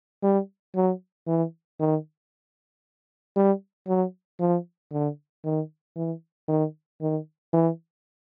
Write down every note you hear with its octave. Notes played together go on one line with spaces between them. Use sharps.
G3
F#3
E3
D#3
G3
F#3
F3
D3
D#3
E3
D#3
D#3
E3